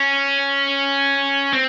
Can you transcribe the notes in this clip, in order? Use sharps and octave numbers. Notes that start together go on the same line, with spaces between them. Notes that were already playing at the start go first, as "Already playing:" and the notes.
Already playing: C#4
C4